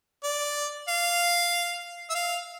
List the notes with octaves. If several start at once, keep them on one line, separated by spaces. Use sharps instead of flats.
D5
F5
E5
F5